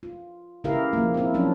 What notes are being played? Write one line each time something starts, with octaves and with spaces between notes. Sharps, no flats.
F4
C#3 E4 G4 A#4 F5
F3 A#3
C4 E4
F3 F#3 C#4 D4